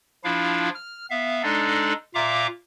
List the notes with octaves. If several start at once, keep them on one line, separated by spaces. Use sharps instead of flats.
F3 D4 E4 F4 F5
F6
B3 E5 F5
G#3 D4 D#4 A4 D5
A#2 F4 E5 F5 A#5 D6